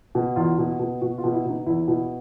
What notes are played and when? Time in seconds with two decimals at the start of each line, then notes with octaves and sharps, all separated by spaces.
0.15 B2
0.36 E2 F4
0.58 B2
0.79 B2
1.02 B2 F#4
1.18 F4
1.24 B2
1.33 E4
1.45 B2 D#4
1.66 E2 E4
1.88 B2 E4